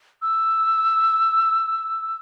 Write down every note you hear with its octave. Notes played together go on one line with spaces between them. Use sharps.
E6